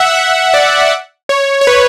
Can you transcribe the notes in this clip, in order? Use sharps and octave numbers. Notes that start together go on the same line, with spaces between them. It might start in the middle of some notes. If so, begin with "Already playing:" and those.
Already playing: E5 F#5
E5
D5
C#5
C#5
B4